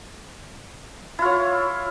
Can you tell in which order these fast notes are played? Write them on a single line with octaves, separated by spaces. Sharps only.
E4 F4 C#5